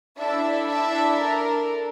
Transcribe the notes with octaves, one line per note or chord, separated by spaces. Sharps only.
D4 E4 A4 E5
E4 E5
A#4